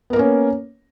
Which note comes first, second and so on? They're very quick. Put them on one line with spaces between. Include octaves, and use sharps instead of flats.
B3 A#4 A#3 C#4